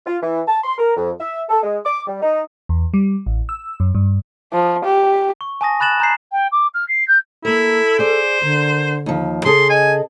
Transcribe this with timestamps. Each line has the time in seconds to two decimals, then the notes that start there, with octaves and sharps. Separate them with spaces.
0.06 F4
0.22 E3
0.47 A5
0.64 C6
0.78 A#4
0.97 F2
1.20 E5
1.49 A4
1.63 G#3
1.85 D6
2.07 G3
2.22 D#4
2.69 E2
2.94 G3
3.26 A1
3.49 E6
3.80 F#2
3.95 G2
4.53 F3
4.85 G4
5.41 C#6
5.61 G#5 A5 D#6 A#6
5.80 B5 F#6 A6 E7 F#7
6.00 A#5 G6 C7
6.32 G5
6.52 D6
6.74 F6
6.88 C7
7.08 G6
7.45 A#3 E4 A4 A#4
7.99 G#4 C5 D5
8.42 D3 A#4
9.06 D#2 F3
9.45 C#3 G#4 A4 C6
9.70 D#5 G#5